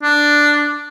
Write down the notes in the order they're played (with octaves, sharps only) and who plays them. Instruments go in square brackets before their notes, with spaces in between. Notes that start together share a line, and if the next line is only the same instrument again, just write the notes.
[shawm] D4